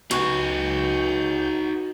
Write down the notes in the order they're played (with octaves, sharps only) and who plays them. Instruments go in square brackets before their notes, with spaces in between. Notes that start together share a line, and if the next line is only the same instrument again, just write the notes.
[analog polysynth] C#2 G6 [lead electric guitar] D#4 B4 [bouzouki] F#4